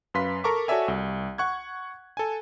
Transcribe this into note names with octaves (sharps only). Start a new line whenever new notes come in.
F#2 B4 F5 C6 B6
A4 A#4 A#5 C#6 D6
F#4 A4 C#5 D5 E5 G#5
C2
F#5 C#6 F#6 G#6
A4 G#5